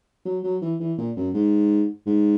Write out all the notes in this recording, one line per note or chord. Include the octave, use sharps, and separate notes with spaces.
F#3
F#3
E3
E3
A#2
F#2
G#2
G#2